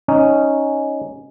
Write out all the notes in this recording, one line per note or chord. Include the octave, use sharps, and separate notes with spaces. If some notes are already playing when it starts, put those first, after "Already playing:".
C#4 D#4